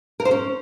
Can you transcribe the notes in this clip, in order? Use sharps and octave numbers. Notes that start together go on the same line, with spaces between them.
A#4
C5
C#4